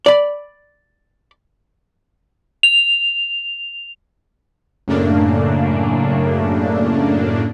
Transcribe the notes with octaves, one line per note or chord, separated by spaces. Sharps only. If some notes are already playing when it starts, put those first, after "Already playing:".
D5 B5
F7
F#2 A2 C#3 A3 A#3 D4